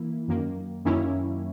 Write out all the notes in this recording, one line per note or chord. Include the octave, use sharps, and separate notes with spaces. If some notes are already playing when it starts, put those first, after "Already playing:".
Already playing: E3 A#3 E4
F#2 D#3 A#3
F#2 D#3 A#3 C#4 E4